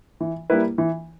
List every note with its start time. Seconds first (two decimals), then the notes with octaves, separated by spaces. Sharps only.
0.20 E3
0.50 G3 A#3 E4 B4
0.78 E3